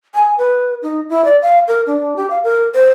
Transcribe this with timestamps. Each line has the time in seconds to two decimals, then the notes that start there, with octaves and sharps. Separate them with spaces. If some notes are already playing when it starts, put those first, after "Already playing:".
0.15 G#5
0.38 B4
0.82 D#4
1.10 E4
1.25 D5
1.42 F5
1.68 A#4
1.87 D4
2.16 G4
2.30 F5
2.44 A#4
2.75 C5